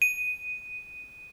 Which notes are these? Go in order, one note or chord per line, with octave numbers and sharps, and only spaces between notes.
D#7